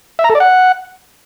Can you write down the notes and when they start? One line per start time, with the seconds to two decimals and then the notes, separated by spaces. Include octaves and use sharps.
0.19 E5
0.24 A#5
0.30 A4
0.35 D5
0.40 F#5